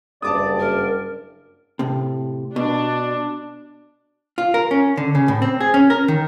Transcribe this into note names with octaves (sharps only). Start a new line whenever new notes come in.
F#1 G2 D5 A5 D6 D#6
A#4
A2 C3
B2 D4
F4
A#4
C#4
D3
C#3
A2
C4
G#4
C#4
A#4
D#3